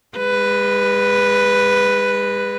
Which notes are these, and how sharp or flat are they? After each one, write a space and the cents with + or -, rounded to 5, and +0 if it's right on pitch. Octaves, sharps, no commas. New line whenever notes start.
G#3 -35 B4 +0